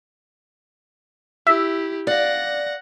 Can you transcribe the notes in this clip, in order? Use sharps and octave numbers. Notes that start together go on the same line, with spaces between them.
E4 G4 E5
D5 F5 F#5 A#6